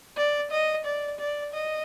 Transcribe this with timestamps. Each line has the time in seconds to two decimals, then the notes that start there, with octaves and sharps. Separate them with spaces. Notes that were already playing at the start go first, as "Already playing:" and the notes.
0.16 D5
0.51 D#5
0.85 D5
1.19 D5
1.53 D#5